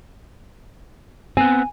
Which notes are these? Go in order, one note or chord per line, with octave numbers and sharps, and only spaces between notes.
B3 C4 G#5